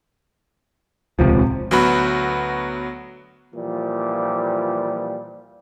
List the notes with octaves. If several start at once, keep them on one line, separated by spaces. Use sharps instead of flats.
D#1 C#2 C3 F3
D2 F#3 B3 F#4 B5
A#2 E3 F3 G3